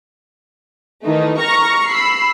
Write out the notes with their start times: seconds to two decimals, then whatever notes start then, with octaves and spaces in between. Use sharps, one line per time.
1.06 D#3 E3 A3 D#4
1.40 A#5 C#6 F6 A#6
1.88 B5 E6 C7